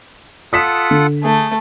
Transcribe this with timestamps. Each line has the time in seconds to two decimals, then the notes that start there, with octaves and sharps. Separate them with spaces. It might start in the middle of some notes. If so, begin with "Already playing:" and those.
0.53 F4 A4 F#5 D#6 B6 E7
0.91 D3
1.23 A3 G#4